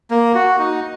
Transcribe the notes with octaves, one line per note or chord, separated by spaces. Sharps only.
A#3
F#4
D#4